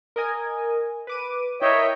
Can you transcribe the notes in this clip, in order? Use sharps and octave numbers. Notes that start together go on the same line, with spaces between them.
A#4 D#5 G#5
B4 D6 D#7
E4 A#4 C#5 D#5 E5 G5